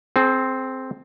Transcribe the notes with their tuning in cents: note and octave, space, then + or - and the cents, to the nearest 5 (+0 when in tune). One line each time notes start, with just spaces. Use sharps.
C4 +0 G#4 +40